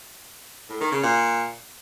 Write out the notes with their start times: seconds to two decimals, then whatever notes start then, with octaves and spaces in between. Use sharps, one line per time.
0.69 A2
0.81 D#3
0.92 C#3
1.03 A#2